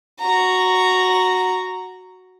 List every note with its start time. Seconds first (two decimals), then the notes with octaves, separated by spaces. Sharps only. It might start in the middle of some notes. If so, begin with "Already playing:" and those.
0.20 F#4 A#5